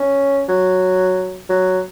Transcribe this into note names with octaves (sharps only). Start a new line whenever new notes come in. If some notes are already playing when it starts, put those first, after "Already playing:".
Already playing: C#4
F#3
F#3